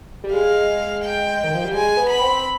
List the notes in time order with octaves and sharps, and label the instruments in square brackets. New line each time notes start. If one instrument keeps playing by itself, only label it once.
[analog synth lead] G3
[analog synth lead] G#3 [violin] F5
[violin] G5
[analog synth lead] D#3
F3
G3
[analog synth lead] G#3 [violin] G#5
[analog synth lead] B3
[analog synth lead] B3 [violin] B5
[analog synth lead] C4